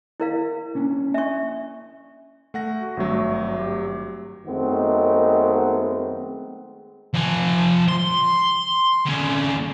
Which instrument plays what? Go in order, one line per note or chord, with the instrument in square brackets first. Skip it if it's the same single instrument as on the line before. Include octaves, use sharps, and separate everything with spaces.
[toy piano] E4 A#4 F5
[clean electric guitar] A#3 C#4 D4
[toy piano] E5 C#6 [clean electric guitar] G#5
[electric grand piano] A3 F#5 A#6
[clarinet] F#4
[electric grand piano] G#1 G2 F#3 [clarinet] A3
[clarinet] G4
[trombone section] F#2 D#3 G#3 A3 B3 C4
[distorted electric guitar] F3 G#5
C6
D3 C#4